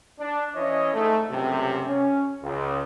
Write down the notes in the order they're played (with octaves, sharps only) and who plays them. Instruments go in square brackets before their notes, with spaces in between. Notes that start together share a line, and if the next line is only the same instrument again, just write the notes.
[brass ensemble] D4
E3 C#4 E4 C#5 D#5
G#2 A3
C#2 F#2 A2 C3
C#4
C#2